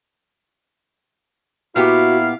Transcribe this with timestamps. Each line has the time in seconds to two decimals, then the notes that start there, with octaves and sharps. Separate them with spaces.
1.76 A#2 B3 E4 F#4 G4 F5